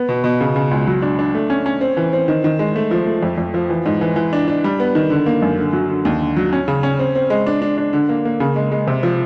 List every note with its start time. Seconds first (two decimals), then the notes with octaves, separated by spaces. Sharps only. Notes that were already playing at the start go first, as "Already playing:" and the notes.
Already playing: B3
0.09 B2
0.24 B2
0.41 C#3
0.56 C#3
0.71 C#2
0.87 F#3
1.02 D4
1.19 D4
1.34 A3
1.50 C#4
1.66 C#4
1.81 C4
1.97 E3
2.13 C4
2.28 D#3
2.44 D#3
2.59 G#3
2.76 A3
2.91 F3
3.06 A3
3.23 F2
3.38 F2
3.54 F3
3.70 E3
3.86 G#2
4.01 E3
4.16 E3
4.33 D4
4.48 D4
4.64 G3
4.80 B3
4.95 D#3
5.10 D3
5.26 A#3
5.42 F#2
5.58 D3
5.73 F#3
5.89 D3
6.05 D#2
6.21 D3
6.37 F#3
6.53 C#4
6.68 C#3
6.83 C#4
6.99 C4
7.15 C4
7.30 G#3
7.47 D4
7.62 D4
7.78 D4
7.93 D3
8.09 A#3
8.25 A#3
8.40 C#3
8.56 G#3
8.72 G#3
8.87 C3
9.03 F3